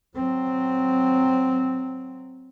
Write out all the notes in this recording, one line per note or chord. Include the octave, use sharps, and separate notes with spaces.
F#3 C4